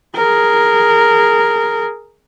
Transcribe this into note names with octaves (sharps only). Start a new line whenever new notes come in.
G#4 A#4